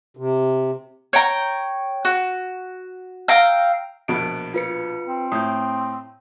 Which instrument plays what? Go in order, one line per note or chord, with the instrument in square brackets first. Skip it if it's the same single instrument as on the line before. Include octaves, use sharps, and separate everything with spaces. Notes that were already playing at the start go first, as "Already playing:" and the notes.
[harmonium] C3
[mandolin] C#5 G5 A#5
F#4
F5 G5 A#5 E6
[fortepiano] A#1 B2 B3 [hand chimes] D7
[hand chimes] F4 B4 C#7
[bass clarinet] C4
[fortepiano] A2 [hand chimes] D#6 G6